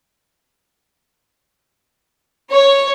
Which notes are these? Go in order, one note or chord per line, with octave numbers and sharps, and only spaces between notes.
C#5